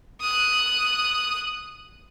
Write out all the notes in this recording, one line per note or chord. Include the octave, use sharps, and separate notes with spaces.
D#6 F#6